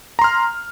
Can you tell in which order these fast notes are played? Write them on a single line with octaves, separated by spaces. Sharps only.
A#5 C6 F6